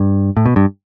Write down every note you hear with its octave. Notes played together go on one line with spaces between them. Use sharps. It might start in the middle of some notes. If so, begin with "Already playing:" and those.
Already playing: G2
A2
B2
G2